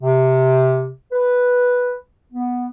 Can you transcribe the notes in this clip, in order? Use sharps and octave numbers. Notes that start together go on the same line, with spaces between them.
C3
B4
B3